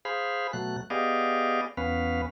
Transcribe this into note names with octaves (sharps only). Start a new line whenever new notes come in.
G#4 C5 F5 B5
B2 F#3 A3 F#6
B3 G4 G#4 D5 D#5 F5
E2 B3 C#4 B4 F5